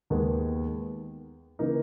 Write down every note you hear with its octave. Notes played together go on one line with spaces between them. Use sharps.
D#2 D#3 G#3 B3
C#3 E3 A#3 D#4